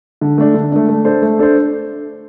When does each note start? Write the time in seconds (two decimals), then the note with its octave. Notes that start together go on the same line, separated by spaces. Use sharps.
0.21 D3
0.38 A3 D4
0.54 D3
0.72 A3 D4
0.89 A3
1.05 D4 A4 C5
1.22 A3
1.39 D4 A4 C5